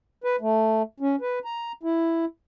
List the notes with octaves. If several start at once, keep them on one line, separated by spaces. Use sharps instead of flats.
B4
A3
C#4
B4
A#5
E4